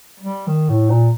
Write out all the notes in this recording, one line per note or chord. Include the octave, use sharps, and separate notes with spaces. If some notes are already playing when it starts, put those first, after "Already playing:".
G3
D#3
A2
A#2